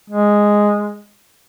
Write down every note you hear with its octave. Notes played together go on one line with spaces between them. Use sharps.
G#3